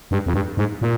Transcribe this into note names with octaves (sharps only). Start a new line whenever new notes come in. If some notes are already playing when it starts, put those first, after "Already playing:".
G2
F2
G2
G#2
A#2